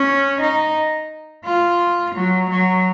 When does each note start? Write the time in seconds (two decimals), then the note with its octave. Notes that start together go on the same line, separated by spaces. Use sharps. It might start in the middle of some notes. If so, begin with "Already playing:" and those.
Already playing: C#4
0.41 D#4
1.45 F4
2.15 F#3
2.50 F#3